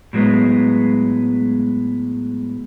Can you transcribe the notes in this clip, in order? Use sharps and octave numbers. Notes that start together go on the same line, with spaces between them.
A2 F#3 G#3 B3